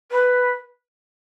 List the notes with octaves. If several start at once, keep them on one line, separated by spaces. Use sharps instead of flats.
B4